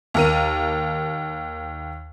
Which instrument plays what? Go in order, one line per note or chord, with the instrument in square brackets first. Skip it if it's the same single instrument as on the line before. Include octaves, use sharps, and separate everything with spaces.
[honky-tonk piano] D#2 A#4 D#7